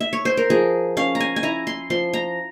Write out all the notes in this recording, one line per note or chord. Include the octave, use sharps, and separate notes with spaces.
E5
C#5
C5
A#4
F3 G#4
C#4 F5
A#5
G#5
G#5
E4 A#5
C6
F3 C6
A#5